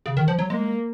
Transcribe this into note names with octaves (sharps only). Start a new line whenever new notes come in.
C#3
D#3
F3
F#3
G#3 A#3